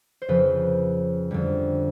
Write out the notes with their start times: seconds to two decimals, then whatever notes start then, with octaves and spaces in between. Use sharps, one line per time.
0.22 C5
0.29 F2 C#3 F3 B4
1.31 F2 D3 G3